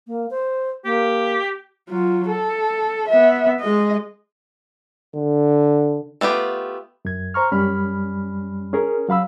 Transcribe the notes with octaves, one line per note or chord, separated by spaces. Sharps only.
A#3
C5
A#3 G4
F#3 F4
A4
B3 E5
G#3 D#5
D3
A3 B3 F4 G4
F#2 G#6
C5 A#5 C#6 F6
F#2 G3 C#4 B5 F6
C#4 G#4 A#4
F#3 F5 B5 E6